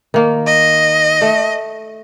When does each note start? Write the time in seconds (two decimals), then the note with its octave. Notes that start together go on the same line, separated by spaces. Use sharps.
0.14 D#3 A#3
0.46 D#5
1.21 A3